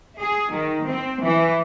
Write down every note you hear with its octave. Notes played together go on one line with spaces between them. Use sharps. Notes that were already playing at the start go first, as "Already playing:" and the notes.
G#4
D#3
C4
E3